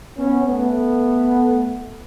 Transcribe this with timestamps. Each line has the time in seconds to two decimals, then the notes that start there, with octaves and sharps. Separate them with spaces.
0.18 B3 C#4
0.47 A3 B3